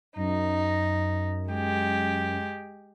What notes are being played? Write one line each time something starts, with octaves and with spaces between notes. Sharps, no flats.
F#2 D#4
G#3 G4